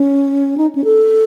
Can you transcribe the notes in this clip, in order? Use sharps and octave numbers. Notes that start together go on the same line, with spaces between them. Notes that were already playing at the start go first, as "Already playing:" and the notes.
Already playing: C#4
D#4
C#4
A4